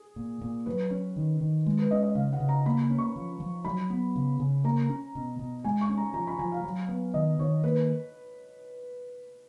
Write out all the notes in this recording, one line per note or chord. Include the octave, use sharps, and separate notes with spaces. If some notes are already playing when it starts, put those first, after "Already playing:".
Already playing: G#4
A#2
A#2
F#3 B4
C#4
D#3
D#3
G#3
B4
C#4 D#5
D#5
C#3 F5
F#5
C#3
A#5
A#3 B5
C#4
C#6
F3
F3
F#3 B5
B3
C#3
C#3
A#3 A#5
C#4
B2
B2
G#3 G#5
C#6
C#4
A#5
F3 A#5
B5
F3 G#5
F5
F#3
B3
D#3 D#5
D#3 C#5
A#3 B4